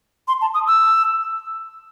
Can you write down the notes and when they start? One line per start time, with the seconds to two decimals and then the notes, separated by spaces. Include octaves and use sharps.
0.28 C6
0.41 A5
0.54 D#6
0.67 E6